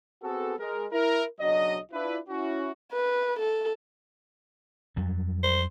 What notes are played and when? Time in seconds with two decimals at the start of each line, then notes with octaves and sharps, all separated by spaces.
0.23 B3 C4 F#4 G#4 A4
0.58 G#3 A#4
0.92 E4 A#4
1.40 B1 C#3 F#3 D4 D#5
1.92 D4 E4 F4 B4
2.29 C#4 E4 F#4
2.93 B4
3.39 A4
4.96 F2 F#3 G3
5.43 C5